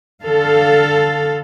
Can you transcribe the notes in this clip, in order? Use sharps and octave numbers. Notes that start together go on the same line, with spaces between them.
D3 A4 F5